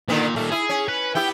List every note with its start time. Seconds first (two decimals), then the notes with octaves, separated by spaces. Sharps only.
0.09 A#2 D3 D#3 B3
0.36 A#2 D#3 A3
0.51 E4 G#4
0.69 C#4
0.88 B4
1.15 B3 E4 G4 G5